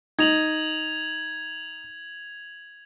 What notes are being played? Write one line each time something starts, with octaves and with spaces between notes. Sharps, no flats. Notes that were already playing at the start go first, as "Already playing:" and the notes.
D#4 G#6 F7 F#7